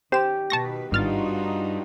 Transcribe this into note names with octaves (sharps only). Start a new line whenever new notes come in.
D#3 C#4 G4 C5 E7
B2 D#3 B4 A5 C#6 A#6
G#1 G2 D#4 F4 F#4 F6 A6